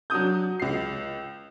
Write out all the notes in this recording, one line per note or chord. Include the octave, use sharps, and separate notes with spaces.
F#3 D4 F#4 D#6 G6
C#2 C7